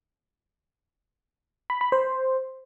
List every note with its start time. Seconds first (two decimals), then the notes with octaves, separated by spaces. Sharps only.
1.70 B5
1.81 B5
1.92 C5